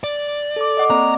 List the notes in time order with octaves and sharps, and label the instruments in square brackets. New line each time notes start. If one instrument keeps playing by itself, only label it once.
[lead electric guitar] D5
[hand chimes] A4 D6
D#5 F#5 D6
[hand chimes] A#3 C4 D5 [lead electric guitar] A#5